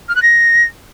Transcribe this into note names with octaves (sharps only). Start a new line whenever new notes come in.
F6
F#6
A#6